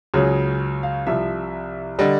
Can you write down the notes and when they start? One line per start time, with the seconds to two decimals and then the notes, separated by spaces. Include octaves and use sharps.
0.14 C#2 C#3 F#3 G#4
0.83 F5
1.07 C2 C3 F3 E5
1.99 D3 G3 D#5